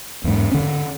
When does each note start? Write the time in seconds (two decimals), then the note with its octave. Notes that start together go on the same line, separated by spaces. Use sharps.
0.24 E2 G#2
0.51 D3 C#4